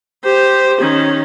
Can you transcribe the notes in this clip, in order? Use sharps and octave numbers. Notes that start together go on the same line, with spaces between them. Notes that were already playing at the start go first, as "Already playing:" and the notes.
G4 C5
D#3 C#4